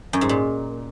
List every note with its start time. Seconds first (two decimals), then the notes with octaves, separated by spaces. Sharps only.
0.13 F#2
0.21 G#2
0.29 A#2